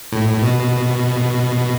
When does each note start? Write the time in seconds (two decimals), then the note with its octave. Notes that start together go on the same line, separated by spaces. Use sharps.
0.12 A2
0.42 B2